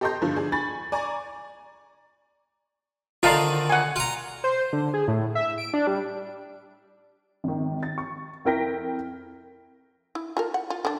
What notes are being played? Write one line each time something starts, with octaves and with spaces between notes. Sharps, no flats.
G4 A4 D#5 A#5 C6 G6
G2 D3 F3
D4 G#4
G#5 B5 C#6 A6
D5 G#5 A#5 C#6
D3 D#3 D#4 F4 F5 A5
F#5 G#5
F4 A#5
C5
D3
G#4
A2
E5
D7
D4
G3
G#1 D#3
A6
C#6
F2 E4 A#4 G5 A#6 B6
E4
F4 A4 A#4
F#5
F4
D3 D4